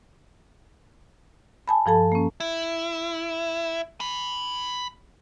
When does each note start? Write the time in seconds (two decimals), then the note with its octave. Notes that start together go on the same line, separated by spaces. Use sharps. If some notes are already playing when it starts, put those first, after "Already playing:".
1.68 G#5 A5 B5
1.86 G2 F3 A4 A5
2.12 A#3 C#4
2.40 E4
4.00 G#5 B5